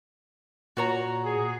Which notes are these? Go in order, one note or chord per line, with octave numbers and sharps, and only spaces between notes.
A#2 F#4 C#5 A#5
G#4